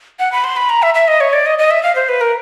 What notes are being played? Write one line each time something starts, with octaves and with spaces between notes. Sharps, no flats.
F#5
B5
C6
B5
A#5
E5
E5
D#5
C#5
D5
D#5
D#5
E5
F5
C5
B4
A#4